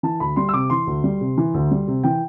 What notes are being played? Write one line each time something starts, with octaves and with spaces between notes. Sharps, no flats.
E3 A5
D2 B5
G3 C6
E6
C3 D6
E3 C6
D2
G3
C3
E3
D2
G3
C3
E3 G5